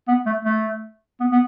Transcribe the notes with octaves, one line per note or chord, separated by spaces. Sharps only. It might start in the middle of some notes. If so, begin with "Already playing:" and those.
B3
A3
A3
B3
B3